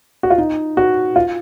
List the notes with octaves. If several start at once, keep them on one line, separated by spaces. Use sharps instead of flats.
F#4
F4
D#4
F#4
F4